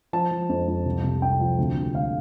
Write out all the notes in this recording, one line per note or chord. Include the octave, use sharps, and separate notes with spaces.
F3 A5
F3
F2
F2
C2
C3
C2 G5
F3
D2
C3
D2 F5